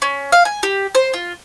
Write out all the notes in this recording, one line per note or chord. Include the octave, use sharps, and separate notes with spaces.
C#4
F5
G#5
G4
C5
F4